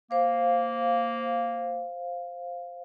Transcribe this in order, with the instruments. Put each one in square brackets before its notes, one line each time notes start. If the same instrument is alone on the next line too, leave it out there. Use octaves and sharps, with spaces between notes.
[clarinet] A#3 [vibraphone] C5 F5